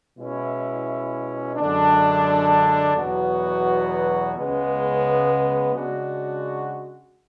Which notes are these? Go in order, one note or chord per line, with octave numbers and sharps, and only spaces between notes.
B2 G#3 C#4 E4
F#2 D3 G#3 D4
E2 B2 F#3 B3 F#4
C#2 C#3 G#3 B3
C#3 G#3 D4 F#4